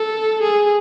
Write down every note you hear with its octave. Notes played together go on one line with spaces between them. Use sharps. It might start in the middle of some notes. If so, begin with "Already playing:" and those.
Already playing: A4
G#4